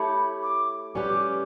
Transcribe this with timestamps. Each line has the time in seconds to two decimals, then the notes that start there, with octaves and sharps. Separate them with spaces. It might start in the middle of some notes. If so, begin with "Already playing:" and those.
Already playing: A3 E4 G4 C#5 B5
0.42 D6
0.95 G3 C#4 G4 B4
1.09 D6